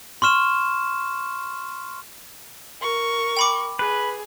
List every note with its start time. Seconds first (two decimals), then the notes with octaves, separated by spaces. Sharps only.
0.22 C6 C#6 F6 E7
2.81 A#4 C#6
3.37 G5 B5 D6
3.79 G#4 B4